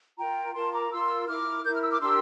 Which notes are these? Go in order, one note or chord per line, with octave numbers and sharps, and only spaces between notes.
F4 A#4 G5 A#5
F4 A#4 A5 C6
A#5 D6
F4 A#4 C6 E6
E4 A#4 D6 F6
E4 A#4 G6
F6
E6
D6 F6
D4 G4 A#4 C6 E6